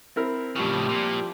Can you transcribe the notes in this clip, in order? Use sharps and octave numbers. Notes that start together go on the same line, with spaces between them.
C4 E4 A#4
A2 C#3 F3 G3 G4
A#2